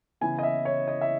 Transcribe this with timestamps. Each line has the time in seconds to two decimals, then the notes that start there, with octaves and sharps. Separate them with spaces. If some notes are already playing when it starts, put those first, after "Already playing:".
0.21 C#3 E3 B3 E4 G#5
0.39 D#5
0.43 E5
0.65 C#5
0.88 D#5
1.01 E5